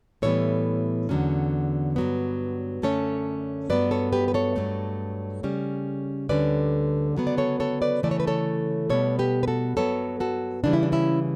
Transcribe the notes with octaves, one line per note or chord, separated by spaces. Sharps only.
A2 E3 G3 B3 A4 C#5
E2 D3 F#3 C#4
G2 F#3 B3
F#2 D3 A3 C#4 A4 C#5
G2 F#3 B3 B4 D5
A4 C#5
G4 B4
B4
A4 C#5
G2 F#3 A3
C#3 G3 C#4
D2 D3 G3 C#4 B4 D5
C#3 F#3 B3
D5
A4 C#5
A4 C#5
B4 D5
C#3 E3 A3 D5
C#5
B4
A4 C#5
B2 G3 B3 A4 C#5
G4 B4
B4
F#4 A4
G2 F#3 B3 A4 C#5
F#4 A4
C#3 E3 G3 D4
E4
D4
C#4 E4